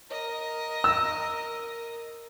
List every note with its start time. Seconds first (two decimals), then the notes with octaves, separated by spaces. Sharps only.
0.10 A#4 D#5
0.84 E6